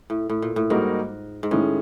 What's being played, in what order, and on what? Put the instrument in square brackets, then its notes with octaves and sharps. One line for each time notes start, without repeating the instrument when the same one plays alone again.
[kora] A2
A2
A#2
A2
[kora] G#2 [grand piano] G3 A#3 D#4 F#4 A#4
[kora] G#2
[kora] A2 [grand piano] D#3 G#3 C#4